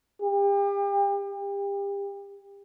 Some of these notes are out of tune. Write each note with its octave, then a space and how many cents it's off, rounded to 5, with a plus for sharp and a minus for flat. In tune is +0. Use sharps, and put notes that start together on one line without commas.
G4 +35
G4 +35